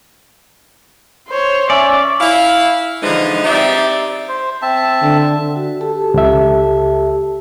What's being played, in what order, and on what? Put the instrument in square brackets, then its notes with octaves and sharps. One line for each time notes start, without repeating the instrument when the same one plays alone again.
[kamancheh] C5 C#5
[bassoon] C#4 [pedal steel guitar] D5 [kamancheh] E5
[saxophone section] E4 F5
D3 E3 F3 G#3 D4 D#4
C4 D#4 G4 D5 E5
[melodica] C5
C4 E5 A5
[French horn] D3
[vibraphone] F#4
G4 A4 A5
[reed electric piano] C#2 E5